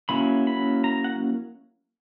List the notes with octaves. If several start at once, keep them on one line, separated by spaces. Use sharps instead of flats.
F#3 A#3 C#4 E4 B5
B5
A#5
F#5